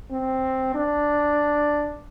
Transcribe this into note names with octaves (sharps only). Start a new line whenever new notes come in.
C4
D4